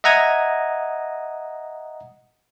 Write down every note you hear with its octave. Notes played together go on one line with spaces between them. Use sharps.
D#5 E5 F#5 A#5 D#6 G#6